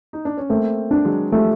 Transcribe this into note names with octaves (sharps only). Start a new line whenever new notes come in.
D#4
D4
C#4
A3 A#3 C4
D4
F#3 G#3
F3 G3 A3